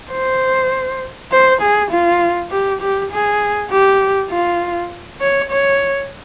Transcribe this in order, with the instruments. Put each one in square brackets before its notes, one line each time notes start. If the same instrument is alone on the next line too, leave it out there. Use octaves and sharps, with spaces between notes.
[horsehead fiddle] C5
C5
G#4
F4
G4
G4
G#4
G4
F4
C#5
C#5